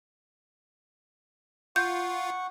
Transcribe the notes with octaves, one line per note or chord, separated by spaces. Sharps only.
F4 F#5 C#6 G6